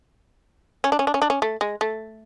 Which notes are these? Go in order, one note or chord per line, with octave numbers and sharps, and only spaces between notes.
C#4
D4
C#4
D4
C#4
D4
C#4
A3
G#3
A3